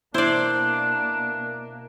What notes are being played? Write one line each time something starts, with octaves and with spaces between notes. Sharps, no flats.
B2 A#3 D4 E4 C5 D5